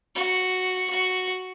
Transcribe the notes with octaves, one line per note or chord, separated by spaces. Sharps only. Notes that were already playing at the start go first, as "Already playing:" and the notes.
F#4
F#4